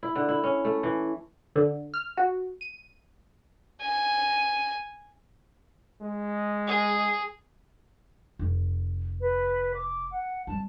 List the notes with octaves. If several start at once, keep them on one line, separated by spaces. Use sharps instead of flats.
E4
D3
E4
C#4
A3
E3
D3
F6
F#4
D#7
G#5
G#3
G#4
F1
B4
D6
F#5
G3 C4 A5